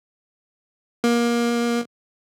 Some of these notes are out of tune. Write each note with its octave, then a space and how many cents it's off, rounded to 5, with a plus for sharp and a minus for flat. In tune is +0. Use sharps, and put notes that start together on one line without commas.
A#3 +25